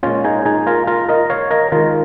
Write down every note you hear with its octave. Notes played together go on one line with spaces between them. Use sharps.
A#2 G#3 C#4 F4
D#4 G#4
D#4 G#4
F4 A#4
F4 A#4
A#4 D#5
C#5 F5
A#4 D#5
D#3 G#3 F4 A#4